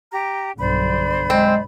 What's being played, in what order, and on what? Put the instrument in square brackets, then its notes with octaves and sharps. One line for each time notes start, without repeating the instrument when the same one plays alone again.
[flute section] G4 A#5
[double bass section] B1 G2 D3 [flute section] C5 D5 B5
[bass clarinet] G#3 [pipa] C4